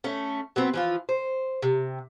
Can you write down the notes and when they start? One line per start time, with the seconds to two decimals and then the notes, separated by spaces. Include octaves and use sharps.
0.04 A3 C#4
0.56 F#3 B3 C4
0.74 E3 F3 F4
1.09 C5
1.62 C3